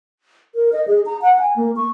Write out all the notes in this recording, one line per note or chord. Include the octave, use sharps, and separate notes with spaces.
A#4
D#5
G#4
A#5
F#5
G#5
A#3
C#6